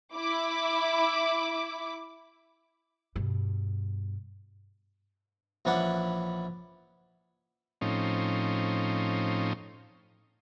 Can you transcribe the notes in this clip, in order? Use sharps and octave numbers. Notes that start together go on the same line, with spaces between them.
E4 D6
G2 B2
A#1 E3 C#4 D4 F#5 B5
A2 F3 C4 C#4 D#4